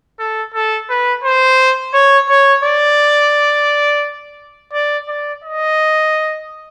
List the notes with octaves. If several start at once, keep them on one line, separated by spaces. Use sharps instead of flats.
A4
A4
B4
C5
C#5
C#5
D5
D5
D5
D#5